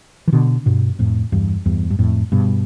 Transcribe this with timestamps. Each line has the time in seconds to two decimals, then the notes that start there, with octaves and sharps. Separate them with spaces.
0.28 E3
0.32 B2 D3
0.66 G2 B2
0.99 F2 A2
1.32 E2 G2
1.66 E2 G2
1.90 G2
1.99 F2 A2
2.32 G2 B2